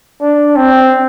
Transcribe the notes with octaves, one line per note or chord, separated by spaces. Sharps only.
D4
C4